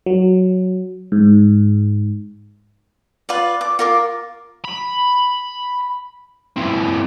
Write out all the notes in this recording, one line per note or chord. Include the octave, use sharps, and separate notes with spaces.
F#3
G#2
F4 B4 D5
D6
F4 A#4 D6
B5
E3 C4